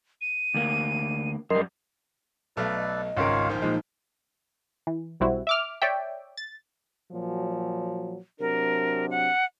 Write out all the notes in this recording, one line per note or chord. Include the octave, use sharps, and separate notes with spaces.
D#7
D2 A#3
F#2 G3 A#4 D#5 C6
B1 A3 A4 B4 D5 F5
D#5
G#1 C#2 C#3 F4 A#4 C#5 F5
A#1 D#3 C5
A#2 F3 G#3 D#4
E3
B1 G3 C4 E4 F#4
E5 D6 F6
C#5 D5 E5 G5
A6
A#2 F3 F#3
C3 F#3 D4 A#4
F#5